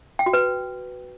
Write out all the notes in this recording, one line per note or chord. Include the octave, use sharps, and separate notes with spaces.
G5
F#4
B4